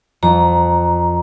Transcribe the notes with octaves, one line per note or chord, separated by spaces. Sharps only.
F2 A#5